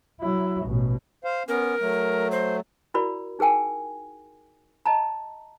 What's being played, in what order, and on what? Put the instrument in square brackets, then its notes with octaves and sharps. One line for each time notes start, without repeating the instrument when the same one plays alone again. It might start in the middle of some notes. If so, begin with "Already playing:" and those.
[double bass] F#3 E4
A1 B2
[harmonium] C5 F5
[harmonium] B3 C#4 [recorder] A#4
[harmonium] F#3 A3
[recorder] C5
[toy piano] E4 F#4 A#4 D5 B5
D#4 G#4 A#4 G5 G#5
D#5 A5 A#5